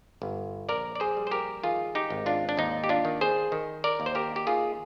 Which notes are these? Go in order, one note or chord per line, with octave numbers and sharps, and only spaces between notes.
G1
A#1 A#4 D5
D5
G#4 C5
G3
C5
G4 A#4
D#3 F4 G#4
D#4 G4
G#1
D4 F4
D4
D#2 D#4
G4
D4 F4
D#3
G#4 C5
D#3
A#4 D5
D#2
C5
G4 A#4
G4
D#3 F4 G#4